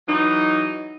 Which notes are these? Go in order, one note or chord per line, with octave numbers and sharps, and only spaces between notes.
E3 F#3 D#4